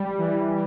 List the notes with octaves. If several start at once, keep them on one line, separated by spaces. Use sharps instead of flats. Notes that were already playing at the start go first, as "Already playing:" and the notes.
Already playing: G3
E3